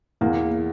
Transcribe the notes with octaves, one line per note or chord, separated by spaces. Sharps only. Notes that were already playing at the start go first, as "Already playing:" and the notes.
E2 A#3